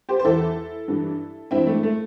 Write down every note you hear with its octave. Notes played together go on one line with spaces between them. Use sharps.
G4 C5
C5
E2 E3 E4 A4
G2 E3
G2 E3 C4 E4
A3
A3